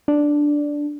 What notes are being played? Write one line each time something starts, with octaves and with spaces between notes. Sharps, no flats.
D4